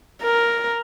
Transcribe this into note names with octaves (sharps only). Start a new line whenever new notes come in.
A#4